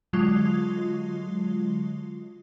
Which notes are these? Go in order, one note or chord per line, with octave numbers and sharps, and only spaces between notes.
D3 F#3 G#3 F4